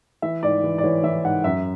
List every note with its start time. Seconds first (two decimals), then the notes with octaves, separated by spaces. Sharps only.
0.22 E3 E5
0.43 G#2 D5
0.64 E3
0.78 D5
0.84 E3 C#5
1.03 E3 E5
1.24 G#2 F#5
1.44 F#2 E5